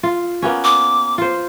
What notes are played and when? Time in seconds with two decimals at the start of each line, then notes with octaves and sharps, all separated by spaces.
0.03 F4
0.42 A#3 B3 C#4
0.64 D6
1.18 F4 C5